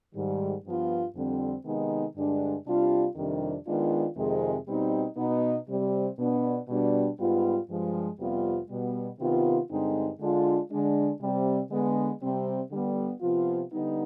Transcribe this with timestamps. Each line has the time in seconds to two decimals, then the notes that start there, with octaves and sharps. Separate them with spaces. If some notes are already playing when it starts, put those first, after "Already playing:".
0.14 G#2 D#3 G3
0.65 G2 F3 B3 F4
1.15 F2 D3 G3 C4
1.66 C3 D#3 G#3 B3 D#4
2.15 G2 D3 G#3 D4
2.66 C3 G3 D4 F4
3.16 F2 C3 D#3 G3 D4
3.67 D#3 G#3 B3 D4 F4
4.16 F2 C3 D#3 G#3
4.67 B2 G3 C4 D#4
5.17 B2 B3 D#4
5.67 C3 G3 C4
6.18 B2 B3 D4
6.68 B2 G3 D4
7.19 G#2 G3 B3 F4
7.69 G2 F3 G#3
8.19 F2 C3 G3 B3 F4
8.69 B2 G3 B3
9.19 C3 D#3 B3 F4
9.70 G2 D3 G#3 C4 D#4
10.19 D3 G#3 D4 F4
10.71 D3 G#3 D4
11.21 C3 G3 C4
11.70 D3 G#3 B3
12.21 C3 G3 C4
12.71 D3 G3 B3
13.21 C3 F3 B3 F4
13.72 D3 G3 B3 D#4